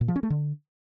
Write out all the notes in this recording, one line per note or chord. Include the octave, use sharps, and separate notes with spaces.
A#2
F3
C#4
A3
D3